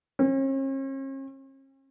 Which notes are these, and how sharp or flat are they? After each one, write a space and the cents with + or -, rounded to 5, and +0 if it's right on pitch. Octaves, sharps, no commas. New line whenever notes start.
C#4 -45